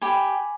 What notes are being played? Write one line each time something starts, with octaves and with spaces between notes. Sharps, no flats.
G4 G#5 B5